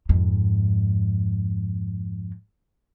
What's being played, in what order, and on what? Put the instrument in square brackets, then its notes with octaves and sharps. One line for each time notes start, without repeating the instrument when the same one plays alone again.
[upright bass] F2 G#2